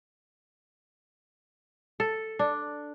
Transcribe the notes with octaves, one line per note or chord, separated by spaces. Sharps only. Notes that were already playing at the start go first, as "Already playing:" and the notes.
A4
D4